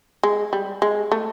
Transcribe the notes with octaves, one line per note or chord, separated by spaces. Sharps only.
G#3
G3
G#3
A3